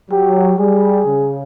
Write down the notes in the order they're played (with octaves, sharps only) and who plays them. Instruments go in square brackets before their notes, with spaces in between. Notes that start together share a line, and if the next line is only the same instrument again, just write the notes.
[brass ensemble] F#3 [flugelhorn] G4
[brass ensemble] G3 [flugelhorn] G#4
[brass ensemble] C#3